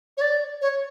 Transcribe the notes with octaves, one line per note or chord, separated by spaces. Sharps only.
C#5
D5
C#5